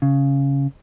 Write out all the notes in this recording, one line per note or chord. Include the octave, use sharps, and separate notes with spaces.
C#3